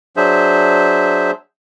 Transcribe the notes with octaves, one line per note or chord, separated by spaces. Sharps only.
F#3 D4 G#4 C5 E5